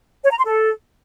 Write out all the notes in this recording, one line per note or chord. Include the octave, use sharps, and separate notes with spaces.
C#5
A#5
C6
A4